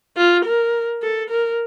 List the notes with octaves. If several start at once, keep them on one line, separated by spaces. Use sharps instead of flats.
F4
A#4
A4
A#4